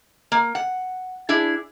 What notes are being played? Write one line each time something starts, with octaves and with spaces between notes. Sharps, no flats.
A#3
F#5
D4 E4 G#4